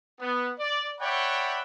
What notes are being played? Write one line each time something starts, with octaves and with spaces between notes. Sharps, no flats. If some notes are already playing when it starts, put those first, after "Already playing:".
B3
D5
C#5 D5 E5 F#5 G5 B5